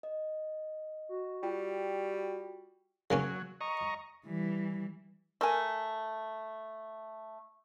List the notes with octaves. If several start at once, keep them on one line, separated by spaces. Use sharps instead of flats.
D#5
F#4
G3 F4 G5
C#3 F#3 A#3 C#4
D#5 A#5 C#6
E3 G3
A3 A#4 G#5